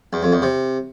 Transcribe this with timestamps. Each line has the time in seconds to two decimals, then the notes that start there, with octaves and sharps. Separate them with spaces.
0.13 E2
0.23 F2
0.32 E2
0.42 C3